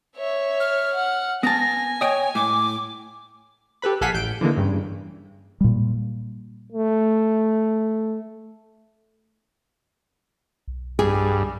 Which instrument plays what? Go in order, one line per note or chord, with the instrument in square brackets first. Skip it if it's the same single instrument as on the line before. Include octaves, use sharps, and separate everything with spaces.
[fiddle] C#5 E5
[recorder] F6
[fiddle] F#5
[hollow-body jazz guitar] B3 A5 [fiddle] G#5 [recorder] A#6
[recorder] C#5 [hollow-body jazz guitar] D#5 G5
[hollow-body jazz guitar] A2 [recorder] D6
[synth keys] G4 A4 B4 B5
A#1 A4 F5 F#5 G#5 B6
A1 G6 D7
D3 E3 G#3 A#3
E2 G2 C#3
[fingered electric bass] A#2 G3
[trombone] A3
[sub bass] B1
[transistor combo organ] G2 [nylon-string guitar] G#4